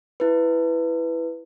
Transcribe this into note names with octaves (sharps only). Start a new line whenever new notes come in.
E4 B4